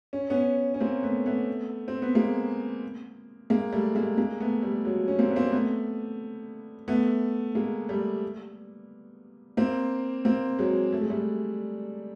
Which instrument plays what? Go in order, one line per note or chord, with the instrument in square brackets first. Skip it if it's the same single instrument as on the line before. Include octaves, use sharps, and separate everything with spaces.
[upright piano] C#4
B3 C#4
C#4
A#3 C4
A3 B3
A3 B3
C4
B3
G#3 A#3
G#3 A#3
G3 A3
G#3 A#3
G#3 A#3
A3 B3
G3 A3
F#3 G#3
C#4
A#3 C4
B3
A#3 C4
A3 B3
A3 B3
G#3 A#3
G3 A3
A#3 C4
A#3 C4
F#3 G#3
A3
G#3
G3 A3